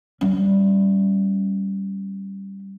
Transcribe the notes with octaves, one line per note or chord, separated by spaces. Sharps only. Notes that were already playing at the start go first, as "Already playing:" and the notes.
G3 C#4